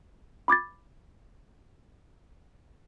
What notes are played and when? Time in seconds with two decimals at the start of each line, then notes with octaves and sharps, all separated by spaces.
0.48 B5 D6 G#6 A6